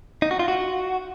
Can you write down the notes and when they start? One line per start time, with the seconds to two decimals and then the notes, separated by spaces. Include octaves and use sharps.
0.22 D#4
0.31 F#4
0.39 F4
0.48 F#4